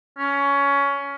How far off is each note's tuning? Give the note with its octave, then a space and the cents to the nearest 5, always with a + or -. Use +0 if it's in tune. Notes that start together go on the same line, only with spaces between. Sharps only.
C#4 +20